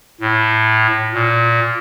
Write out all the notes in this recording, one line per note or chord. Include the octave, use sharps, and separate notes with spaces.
A2
A#2